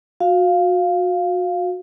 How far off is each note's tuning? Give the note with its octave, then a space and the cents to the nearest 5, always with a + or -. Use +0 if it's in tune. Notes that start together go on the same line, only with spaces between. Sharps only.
F#4 -30 F5 +0